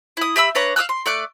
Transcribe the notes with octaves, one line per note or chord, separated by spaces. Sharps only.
E4 D#6
G4 E5 B5 E6
D4 B4 C#5 A#5
F5 D#6 E6 F#6
C6
A3 D5 D6 F#6